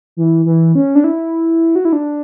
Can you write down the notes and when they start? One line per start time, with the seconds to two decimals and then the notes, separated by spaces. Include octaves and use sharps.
0.17 E3
0.46 E3
0.75 C#4
0.95 D4
1.04 E4
1.75 F#4
1.85 E4
1.93 D4